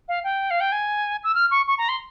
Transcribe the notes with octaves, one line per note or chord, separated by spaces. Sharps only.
F5
G5
F5
G5
G#5
E6
F6
C#6
C#6
A#5
C6